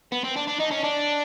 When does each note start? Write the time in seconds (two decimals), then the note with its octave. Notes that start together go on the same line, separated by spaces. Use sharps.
0.12 B3
0.24 C4
0.37 D4
0.48 D4
0.60 D#4
0.72 C#4
0.84 D4